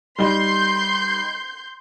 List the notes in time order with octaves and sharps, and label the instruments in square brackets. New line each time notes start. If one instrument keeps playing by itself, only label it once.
[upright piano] G3 D#4 G7 [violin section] C6 G6